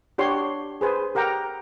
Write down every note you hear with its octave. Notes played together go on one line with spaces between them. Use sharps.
D4 F#4 G4 C#5 C6
G#4 B4 C5 G#5
G4 A#4 F#5 G5 A#5 D6